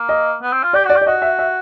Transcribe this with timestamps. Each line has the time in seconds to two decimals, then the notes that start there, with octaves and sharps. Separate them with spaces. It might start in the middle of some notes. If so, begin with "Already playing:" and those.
Already playing: A#3
0.09 D#5
0.42 B3
0.53 C4
0.63 F4
0.73 G4 D5
0.85 F#4
0.89 D5
0.96 G4
1.01 D5
1.06 F#4 D#5
1.22 E5
1.39 E5